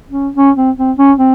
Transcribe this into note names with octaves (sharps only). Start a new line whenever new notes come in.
C#4
C#4
C4
C4
C#4
C4